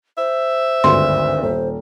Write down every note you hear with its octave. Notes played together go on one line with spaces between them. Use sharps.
C5 E5
G#1 D2 G2 C6
D#1 C5